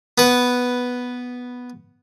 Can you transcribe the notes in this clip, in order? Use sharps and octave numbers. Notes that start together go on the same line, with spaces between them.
B3 B4